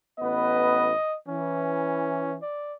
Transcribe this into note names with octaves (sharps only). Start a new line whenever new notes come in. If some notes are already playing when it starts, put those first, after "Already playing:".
A1 B3 B4 D#5
E3 C#4
D5